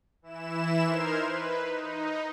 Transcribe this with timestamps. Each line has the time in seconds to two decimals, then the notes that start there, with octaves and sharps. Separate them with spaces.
0.22 E3 E4 E7
0.84 D#4 A#4 C5 C6 F6 G#6
1.19 B4
1.68 D#4